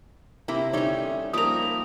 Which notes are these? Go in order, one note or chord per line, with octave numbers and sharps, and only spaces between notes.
C3 A#3 E4 C5
G3 A3 C#4 D#4 C#5
F3 G3 A#3 D#4 A#4 D#6 F7